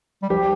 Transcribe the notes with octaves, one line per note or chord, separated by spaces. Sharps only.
G3
F3 G4